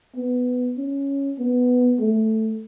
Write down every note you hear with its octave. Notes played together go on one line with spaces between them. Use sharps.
B3
C#4
B3
A3